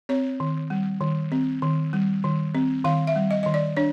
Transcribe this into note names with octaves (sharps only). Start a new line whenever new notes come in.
C4 C#5
D#3
G3
D#3
C4
D#3
G3
D#3
C4
D#3 F5
E5
G3
D#5
D#3 D#5
D5
D4 C#5